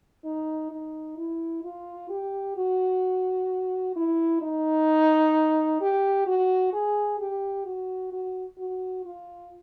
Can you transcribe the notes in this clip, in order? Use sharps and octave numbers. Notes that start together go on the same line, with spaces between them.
D#4
D#4
E4
F4
G4
F#4
E4
D#4
G4
F#4
G#4
G4
F#4
F#4
F#4
F4